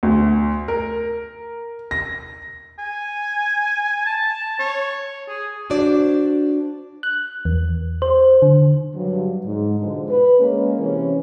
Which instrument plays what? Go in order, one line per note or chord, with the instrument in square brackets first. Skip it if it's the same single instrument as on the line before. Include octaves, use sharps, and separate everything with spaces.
[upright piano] D2
A#4
A#6
[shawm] G#5
A5
C#5
G#4
[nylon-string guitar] D4 F#4 C5 D5
[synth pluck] F#6
E2
C5
D3
[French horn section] G2 F#3
G#2
G#2 B2 D3 F3 G#3
B4
G#3 A#3 C#4
C3 E3 C#4